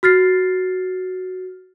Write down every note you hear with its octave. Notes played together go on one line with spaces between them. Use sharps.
F#4 F6 A6 C7